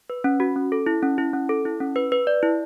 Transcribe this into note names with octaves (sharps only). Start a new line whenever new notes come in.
B4
C#4
F#4
C#4
A4
E4
C#4
E4
C#4
A4
E4
C#4
B4
B4
D5
E4